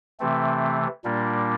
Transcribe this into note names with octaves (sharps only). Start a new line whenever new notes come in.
C3 E3 A3 C4
A#2 G3 A#3 D4